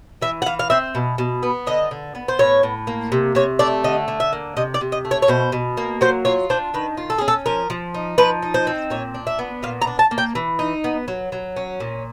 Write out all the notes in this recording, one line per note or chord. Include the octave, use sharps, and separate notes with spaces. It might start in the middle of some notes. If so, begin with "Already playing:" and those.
E3 E5
F#5
E3 F5
F5
C4 E5
B2
B2
B3
D3 D#5
D3
B3
C5
A2 C#5
A2
A#3
C3
C3 C#5
A3 D5
D3 D#5
D3
E5
A#3
C3 D#5
D5
C3
D#5
A3
C#5
C#5
B2 C5
B2
A#3
F#3 C5
F4 C#5
D4 C5
D#3 B4
F4
A4
C#4 G#4
A4
F3 A#4
F3
D#4
F3 B4
D#4
C5
C4
A#2 C#5
D4
E5
B3
A#2 F5
A#5
D4
A5
A#3
G5
E3
D#4
B3
F#3
F#3
C#4
A#2